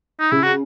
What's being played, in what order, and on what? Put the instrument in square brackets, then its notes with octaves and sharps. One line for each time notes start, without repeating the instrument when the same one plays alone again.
[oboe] D#4
[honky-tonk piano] C#3 [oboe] E4
[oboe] F#4